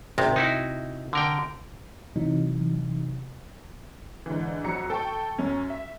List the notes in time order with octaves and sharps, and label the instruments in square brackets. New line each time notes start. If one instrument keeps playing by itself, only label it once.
[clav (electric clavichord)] G#1 [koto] C3
[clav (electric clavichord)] D#4 E4 F#4
D3 A#4 G5
[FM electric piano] C3 E3 F#3 D#4
[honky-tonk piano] G#2 D3 E3
F2 F#3 F#4 A#5 C#7
A4 G5 A5 C#6
F#2 C#4
E5